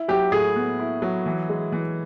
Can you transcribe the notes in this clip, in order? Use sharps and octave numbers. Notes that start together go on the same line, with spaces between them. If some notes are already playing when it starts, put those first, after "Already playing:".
Already playing: E4
F#3 G4
A2 G#4
B3
E4
F#3
E3
G#3
E3